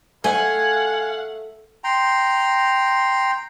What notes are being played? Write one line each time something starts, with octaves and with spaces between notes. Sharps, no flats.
A3 F5 F#5 G#5
G5 A#5 C6